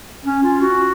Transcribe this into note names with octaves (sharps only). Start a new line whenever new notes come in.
C#4
F4
F#4